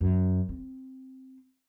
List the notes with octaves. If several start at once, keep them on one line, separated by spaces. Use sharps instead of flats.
F#2
C4